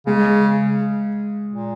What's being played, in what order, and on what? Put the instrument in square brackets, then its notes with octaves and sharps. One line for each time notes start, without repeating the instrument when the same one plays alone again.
[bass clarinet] C#3 [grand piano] G#3
[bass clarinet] A#2